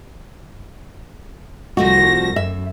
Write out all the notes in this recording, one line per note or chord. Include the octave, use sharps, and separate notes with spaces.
C2 F3 A3 F#4 A#6
F#2 E5